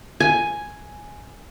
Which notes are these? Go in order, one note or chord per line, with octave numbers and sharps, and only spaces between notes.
G#5